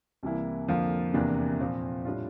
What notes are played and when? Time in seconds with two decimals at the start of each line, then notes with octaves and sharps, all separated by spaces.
0.23 C2 C3 E3 A#3 E4
0.68 F2 D3 F3 A#3 F4
1.14 E2 C3 E3 A#3 D4
1.59 A#2 F3 C4
2.05 A2 G3 D4 F4